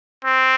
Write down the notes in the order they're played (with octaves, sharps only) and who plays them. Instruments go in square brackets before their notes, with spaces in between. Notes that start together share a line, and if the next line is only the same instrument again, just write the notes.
[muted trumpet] C4